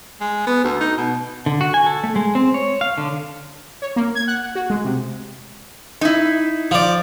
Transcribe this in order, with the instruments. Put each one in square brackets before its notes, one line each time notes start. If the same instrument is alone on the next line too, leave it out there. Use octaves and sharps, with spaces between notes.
[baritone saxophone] G#3
B3
D2
D#4
B2
[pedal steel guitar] D3
F#4
G#5
A4
A3
G#3
C4
C#5
F5
D3
[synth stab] C#5
A#3
G#6
F#5
F#5
F#4
G#3
C3
[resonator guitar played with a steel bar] D#4 E4
[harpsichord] F3 D5